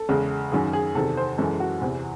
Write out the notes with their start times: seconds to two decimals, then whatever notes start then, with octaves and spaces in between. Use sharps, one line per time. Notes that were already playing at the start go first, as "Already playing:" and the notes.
Already playing: A4
0.09 E2 C#3 G#3
0.52 F#2 D#3 F#3 G#4
0.73 G#4
0.95 E2 C3 D#3 A4
1.17 C5
1.38 F#2 E3 G#3 A4
1.60 F#4
1.81 E2 C3 E3